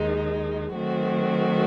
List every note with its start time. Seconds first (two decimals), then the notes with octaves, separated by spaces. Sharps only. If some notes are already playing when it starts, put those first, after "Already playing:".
Already playing: D#2 D#3 G#3 D#4
0.75 D#3 F#3 A3 C4 F#4